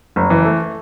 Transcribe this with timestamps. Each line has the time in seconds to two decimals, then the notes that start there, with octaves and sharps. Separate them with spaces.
0.16 F#1
0.30 E3
0.45 A3